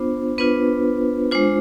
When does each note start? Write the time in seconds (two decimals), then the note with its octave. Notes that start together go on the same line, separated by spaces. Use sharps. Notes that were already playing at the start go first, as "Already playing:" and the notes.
Already playing: B3 D4 F4 C5
0.38 B3 D4 F4 B4
1.31 G#3 D4 F4 C5